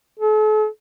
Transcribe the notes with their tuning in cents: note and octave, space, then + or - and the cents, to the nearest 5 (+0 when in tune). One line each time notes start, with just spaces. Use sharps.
A4 -40